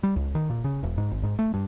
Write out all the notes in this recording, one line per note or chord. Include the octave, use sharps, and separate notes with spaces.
G3
C#2
D#3
A#2
C#3
E1
G#2
G#1
G#2
A3
G2